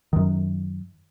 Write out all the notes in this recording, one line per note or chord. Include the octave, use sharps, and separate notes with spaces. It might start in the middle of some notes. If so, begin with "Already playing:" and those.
F#2 D#3